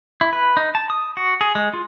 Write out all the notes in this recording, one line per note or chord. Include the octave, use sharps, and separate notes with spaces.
E4
B4
D#4
A5
D#6
F#4
G#4
G#3
F4